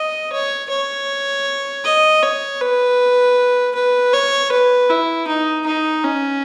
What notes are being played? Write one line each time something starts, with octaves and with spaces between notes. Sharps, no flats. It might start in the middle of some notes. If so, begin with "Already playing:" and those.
Already playing: D#5
C#5
C#5
D#5
C#5
B4
B4
C#5
B4
E4
D#4
D#4
C#4